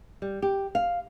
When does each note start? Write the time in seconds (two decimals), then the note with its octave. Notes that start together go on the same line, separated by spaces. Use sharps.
0.22 G3
0.42 G4
0.75 F5